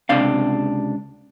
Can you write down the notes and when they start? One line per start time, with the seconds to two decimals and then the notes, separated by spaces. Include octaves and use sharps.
0.09 C#2 C3 D4 F5